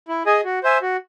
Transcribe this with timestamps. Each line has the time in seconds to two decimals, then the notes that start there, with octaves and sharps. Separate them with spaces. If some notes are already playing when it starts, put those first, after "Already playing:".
0.08 E4
0.26 G#4 D#5 G#5
0.44 F#4
0.64 C5 E5 G#5
0.82 F#4